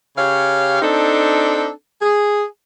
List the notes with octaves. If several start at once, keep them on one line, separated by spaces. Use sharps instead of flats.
C#3 G4 C#5 F5
C4 D4 D#4 A4
G#4